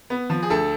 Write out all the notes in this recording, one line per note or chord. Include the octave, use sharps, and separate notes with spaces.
B3
F3
G#4
D2 A4